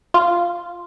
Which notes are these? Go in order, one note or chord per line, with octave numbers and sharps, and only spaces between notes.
F4